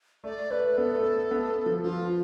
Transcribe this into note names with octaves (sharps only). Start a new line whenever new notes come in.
A3 D5
A3 B4
B3 A4
A3
B3
F3
F3 F4